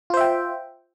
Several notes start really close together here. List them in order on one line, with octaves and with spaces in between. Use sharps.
F4 C5 E5 G5